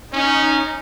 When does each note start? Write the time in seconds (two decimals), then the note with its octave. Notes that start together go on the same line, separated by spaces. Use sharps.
0.13 C#4 D#4